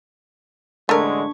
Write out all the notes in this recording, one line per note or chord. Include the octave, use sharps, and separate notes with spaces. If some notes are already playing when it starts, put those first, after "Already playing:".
A1 D3 G#3 A3 D4 A#4 C#6